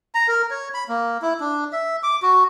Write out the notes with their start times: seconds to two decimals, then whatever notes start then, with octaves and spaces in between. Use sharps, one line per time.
0.15 A#5
0.28 A#4
0.50 C#5
0.74 B5
0.89 A#3
1.22 E4
1.40 D4
1.73 E5
2.03 D6
2.22 F#4